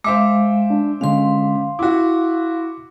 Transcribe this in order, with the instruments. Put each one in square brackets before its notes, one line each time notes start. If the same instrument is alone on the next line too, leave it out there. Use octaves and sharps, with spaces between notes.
[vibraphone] G#3 F5 [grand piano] C5 E5 D6
[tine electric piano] D4
[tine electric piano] D3 G#3 C#4 [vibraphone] F5 C6
[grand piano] E4 F#4 [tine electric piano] D6